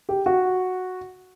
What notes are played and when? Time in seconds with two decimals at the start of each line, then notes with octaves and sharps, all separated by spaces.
0.09 G4
0.26 F#4